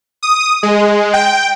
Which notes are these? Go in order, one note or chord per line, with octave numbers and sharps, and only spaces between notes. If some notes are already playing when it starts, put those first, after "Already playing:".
D#6
G#3
G5